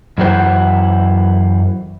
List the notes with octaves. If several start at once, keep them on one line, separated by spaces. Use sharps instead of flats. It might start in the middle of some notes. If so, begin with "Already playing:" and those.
F#2 E3 F#4 C5